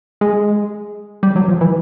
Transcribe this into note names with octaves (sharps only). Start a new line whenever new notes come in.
G#3
G3
F#3
F3
E3